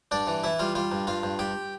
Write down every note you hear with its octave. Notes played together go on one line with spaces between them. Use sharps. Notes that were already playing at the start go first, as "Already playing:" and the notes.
G2 D4 D5
E3
E3 E4 E5
G3 F4 F5
G3 F4 F5
G2
G2 F4 F5
G2
G2 G4 G5